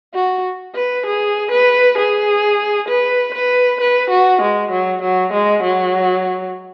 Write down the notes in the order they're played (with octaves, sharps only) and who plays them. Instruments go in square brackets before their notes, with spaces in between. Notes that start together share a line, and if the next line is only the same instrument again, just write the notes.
[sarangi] F#4
B4
G#4
B4
G#4
B4
B4
B4
F#4
G#3
F#3
F#3
G#3
F#3